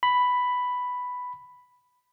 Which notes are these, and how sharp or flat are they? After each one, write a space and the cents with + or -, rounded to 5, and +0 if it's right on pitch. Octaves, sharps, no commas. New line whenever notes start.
B5 +5